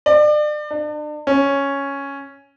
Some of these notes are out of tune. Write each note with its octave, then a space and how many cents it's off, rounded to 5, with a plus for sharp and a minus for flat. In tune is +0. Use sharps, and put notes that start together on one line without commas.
D5 +35
D4 +40
C#4 +0